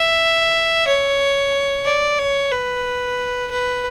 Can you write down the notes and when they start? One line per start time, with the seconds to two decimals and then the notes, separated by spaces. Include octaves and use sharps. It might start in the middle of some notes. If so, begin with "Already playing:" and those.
Already playing: E5
0.87 C#5
1.85 D5
2.18 C#5
2.52 B4
3.51 B4